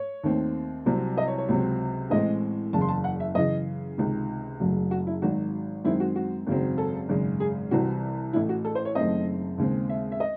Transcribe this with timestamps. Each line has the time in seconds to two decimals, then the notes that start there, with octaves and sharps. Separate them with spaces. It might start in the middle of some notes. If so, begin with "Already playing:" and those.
Already playing: C#5
0.24 D#2 D#3 A3 C4
0.86 C2 C3 F#3 C4
1.18 D#5
1.28 C#5
1.38 C#5
1.49 C#2 C3 F#3 C4
2.10 A1 A2 G#3 C4 D#5
2.73 F#1 E2 C#3 A5
2.81 C6
2.88 A5
3.04 F#5
3.20 E5
3.35 F#2 C#3 E3 D#5
3.98 C#2 C3 D#3
4.60 F#1 F#2 C#3 F#3 A3
4.91 F#4
5.07 E4
5.22 G#1 G#2 D#3 F#3 F#4
5.84 F#2 D#3 G#3 C4 E4
6.00 F#4
6.16 F#4
6.47 G#1 F#2 C#3 F#3 C4
6.78 A4
7.09 G#1 F#2 C#3 G#3
7.40 G#4
7.71 C2 C3 E3 C4 F#4
8.33 A1 A2 E3 E4
8.49 F#4
8.65 A4
8.75 C5
8.85 C#5
8.95 F#1 F#2 D#3 A3 C4 D#5
9.58 D#2 C#3 G#3 C4
9.89 E5
10.12 E5
10.20 D#5